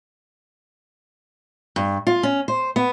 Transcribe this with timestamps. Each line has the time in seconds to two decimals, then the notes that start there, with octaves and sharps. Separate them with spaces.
1.76 G2
2.07 F4
2.23 C#4
2.48 C5
2.76 B3